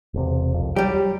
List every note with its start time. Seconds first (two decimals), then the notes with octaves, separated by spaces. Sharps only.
0.14 E1 C3
0.54 C2 F2
0.76 F#3 G3 G4